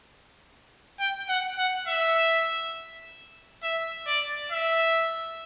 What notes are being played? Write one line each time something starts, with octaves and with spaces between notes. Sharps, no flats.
G5
F#5
F#5
E5
E5
D5
E5